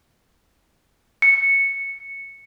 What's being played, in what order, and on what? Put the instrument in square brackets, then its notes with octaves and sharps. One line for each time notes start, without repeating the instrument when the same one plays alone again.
[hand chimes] C#7